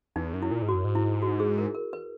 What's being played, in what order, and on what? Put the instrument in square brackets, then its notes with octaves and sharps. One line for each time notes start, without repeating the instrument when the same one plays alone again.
[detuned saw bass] E2 [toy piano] D#4
[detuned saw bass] F#2
[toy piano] E4
[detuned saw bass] A#2
G#2
[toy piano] F#4
[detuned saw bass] F#2
G#2
[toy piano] E4
F#4
G#4
A#4
A#4
B4